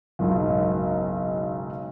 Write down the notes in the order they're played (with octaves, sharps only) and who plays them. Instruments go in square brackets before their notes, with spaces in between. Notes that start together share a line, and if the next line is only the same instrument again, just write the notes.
[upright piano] F#1 B1 G#2 D#4